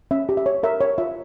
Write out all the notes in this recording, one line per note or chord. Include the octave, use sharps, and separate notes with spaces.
C#4 E5
G4
E5
C#5
A#4 E5
C#5
F4 E5